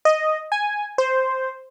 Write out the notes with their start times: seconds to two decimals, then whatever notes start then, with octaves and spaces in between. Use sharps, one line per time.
0.05 D#5
0.52 G#5
0.98 C5